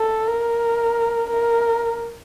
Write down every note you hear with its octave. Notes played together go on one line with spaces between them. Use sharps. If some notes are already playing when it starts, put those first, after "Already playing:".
Already playing: A4
A#4
A#4